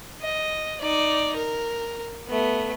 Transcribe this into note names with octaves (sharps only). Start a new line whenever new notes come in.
D#5
D#4 D5
A#4
A3 B3